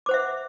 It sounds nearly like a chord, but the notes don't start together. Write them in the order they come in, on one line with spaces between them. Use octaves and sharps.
D6 C5 F#5 E5